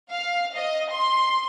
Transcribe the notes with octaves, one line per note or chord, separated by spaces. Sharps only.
F5
D#5
C6